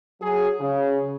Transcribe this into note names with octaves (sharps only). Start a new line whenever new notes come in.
F#3 G#4
C#3